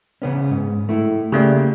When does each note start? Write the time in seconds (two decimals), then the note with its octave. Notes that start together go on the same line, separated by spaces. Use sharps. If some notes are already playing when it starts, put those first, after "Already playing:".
0.22 C#3 B3 C#4
0.51 G#2
0.89 A3 E4
1.32 C#3 A3 A#3 G4 D5